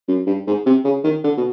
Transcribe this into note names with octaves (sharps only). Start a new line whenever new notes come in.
F#2
G2
G#2
C3
C#3
D#3
D3
B2